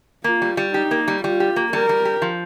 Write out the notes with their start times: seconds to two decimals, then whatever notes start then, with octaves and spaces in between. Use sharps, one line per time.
0.24 A#3 F4
0.42 G3
0.57 G3
0.74 D#4 G4
0.91 A#3
1.08 G3
1.23 G3 F4
1.40 G4
1.56 A#3
1.73 G3 A#4
1.89 G3
2.05 G4
2.22 F3